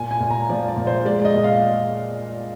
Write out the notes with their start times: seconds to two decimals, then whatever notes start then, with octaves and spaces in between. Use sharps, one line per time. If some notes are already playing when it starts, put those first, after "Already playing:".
Already playing: A#2 G#5
0.11 G#5
0.20 A#2
0.30 A#5
0.49 F3 D5
0.68 D5
0.77 A#2
0.87 C5
1.05 G#3 D5
1.25 D#5
1.35 A#2
1.44 F5